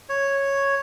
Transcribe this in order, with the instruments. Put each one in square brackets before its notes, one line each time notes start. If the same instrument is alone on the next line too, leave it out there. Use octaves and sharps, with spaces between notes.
[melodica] C#5